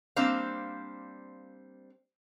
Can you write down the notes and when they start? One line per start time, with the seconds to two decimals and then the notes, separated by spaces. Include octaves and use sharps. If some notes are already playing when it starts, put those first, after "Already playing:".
0.16 G3 A#3 C4 D4 C5 F5